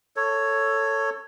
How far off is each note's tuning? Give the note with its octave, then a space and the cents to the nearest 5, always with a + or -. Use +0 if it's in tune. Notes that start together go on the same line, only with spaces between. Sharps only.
A4 +15 C#5 +0